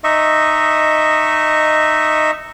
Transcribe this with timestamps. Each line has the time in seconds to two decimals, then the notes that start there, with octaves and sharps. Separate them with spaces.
0.04 D#4 D#5 E5 C#6